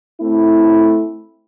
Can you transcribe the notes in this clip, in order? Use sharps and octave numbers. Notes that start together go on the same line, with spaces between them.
A3 C4 E4